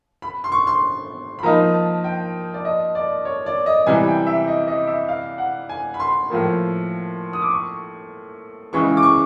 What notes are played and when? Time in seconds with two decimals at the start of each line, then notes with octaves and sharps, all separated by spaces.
0.22 B5
0.44 C6
0.52 C#6
0.67 C6
1.39 B5
1.43 F3 A#3 D#4 A#5
1.74 A5
2.04 G5
2.54 D5
2.65 D#5
2.95 D5
3.25 C#5
3.46 D5
3.66 D#5
3.86 C3 E3 G3 G#5
4.07 G5
4.27 E5
4.48 D#5
4.68 D#5
4.87 E5
5.08 F5
5.38 F#5
5.69 G#5
5.94 B5
6.00 C6
6.30 A2 F3 A#3
7.33 D#6
7.42 D6
7.51 C#6
8.73 C#3 E3 G#3 C#6
8.97 D6
9.03 C#6